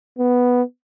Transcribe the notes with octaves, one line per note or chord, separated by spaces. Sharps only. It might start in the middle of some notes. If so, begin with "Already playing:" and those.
B3